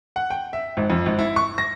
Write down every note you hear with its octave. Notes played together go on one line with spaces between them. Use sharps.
F#5
G5
E5
G#1
F2
G#1
E4
C#6
A#6